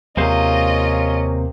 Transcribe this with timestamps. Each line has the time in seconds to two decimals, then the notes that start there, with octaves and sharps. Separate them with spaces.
0.17 D#2 C3 G#3 A#3 C#4 F4 C5 D#5